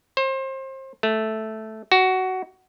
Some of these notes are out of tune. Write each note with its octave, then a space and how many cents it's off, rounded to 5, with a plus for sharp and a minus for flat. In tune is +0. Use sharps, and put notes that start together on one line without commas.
C5 +30
A3 -5
F#4 +15